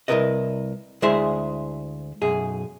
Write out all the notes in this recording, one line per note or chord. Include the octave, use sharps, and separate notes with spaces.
C2 D3 E4 A#4 B4 D#5
D2 G#3 E4 G#4 C5 E5
B1 F#2 G#4